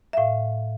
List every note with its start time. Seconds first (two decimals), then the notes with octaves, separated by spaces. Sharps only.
0.13 E5
0.17 A2 F5